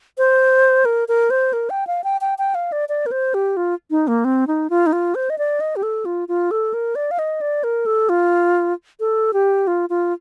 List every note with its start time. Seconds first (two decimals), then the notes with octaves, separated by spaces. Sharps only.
0.18 C5
0.85 A#4
1.08 A#4
1.30 C5
1.53 A#4
1.70 G5
1.87 F5
2.04 G5
2.21 G5
2.38 G5
2.55 F5
2.72 D5
2.89 D5
3.06 A#4
3.11 C5
3.34 G4
3.57 F4
3.91 D#4
4.08 A#3
4.25 C4
4.47 D#4
4.70 F4
4.86 D#4
4.93 F4
5.15 C5
5.30 D#5
5.38 D5
5.60 D#5
5.76 G4
5.83 A4
6.05 F4
6.28 F4
6.51 A4
6.74 A#4
6.95 D5
7.11 F5
7.19 D#5
7.41 D5
7.64 A#4
7.86 A4
8.09 F4
9.00 A4
9.33 G4
9.67 F4
9.90 F4